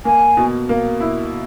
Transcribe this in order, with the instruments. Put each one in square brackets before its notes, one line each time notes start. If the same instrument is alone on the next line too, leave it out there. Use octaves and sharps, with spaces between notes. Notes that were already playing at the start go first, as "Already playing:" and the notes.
[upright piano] A#3 [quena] G#5
[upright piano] B2
A#3
E4